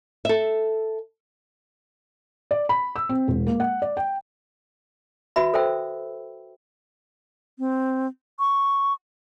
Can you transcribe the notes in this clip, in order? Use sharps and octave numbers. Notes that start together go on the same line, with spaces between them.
A4 E5
D5
B5
E6
C4
E1
A#3
F#5
D5
G5
F#4 B4 E5 B5
A4 C5 E5 G5 E6
C4
C#6